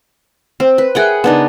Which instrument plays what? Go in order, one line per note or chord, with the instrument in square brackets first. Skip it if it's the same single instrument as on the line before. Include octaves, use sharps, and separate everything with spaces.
[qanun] C4 [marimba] C5 G5
[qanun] B4
[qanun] G#4 F#5 G5 [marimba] A#4 E5 F#6
[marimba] C#3 A#4 [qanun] B3 D4 D#4